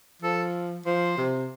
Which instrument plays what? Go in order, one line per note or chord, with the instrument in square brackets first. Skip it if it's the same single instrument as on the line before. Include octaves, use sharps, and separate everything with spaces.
[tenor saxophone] F3 [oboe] A4
[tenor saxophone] F3 [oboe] C5
[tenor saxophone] C3